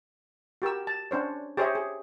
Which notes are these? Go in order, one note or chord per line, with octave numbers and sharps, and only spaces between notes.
F#4 G4 A#4 E6
A5
C#4 D4 C5 C#5
G4 G#4 C5 C#5 D#5 E5
G#4